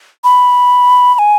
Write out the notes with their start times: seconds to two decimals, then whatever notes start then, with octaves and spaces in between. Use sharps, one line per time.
0.24 B5
1.14 B5
1.19 G#5